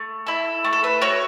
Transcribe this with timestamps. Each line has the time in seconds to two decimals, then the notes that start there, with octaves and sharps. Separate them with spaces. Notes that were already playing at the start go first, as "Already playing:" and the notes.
Already playing: A3
0.26 E4 A4
0.65 A3
0.73 A4
0.84 B4
1.02 F#4 A4 C#5